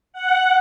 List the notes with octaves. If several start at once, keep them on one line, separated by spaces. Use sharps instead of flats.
F#5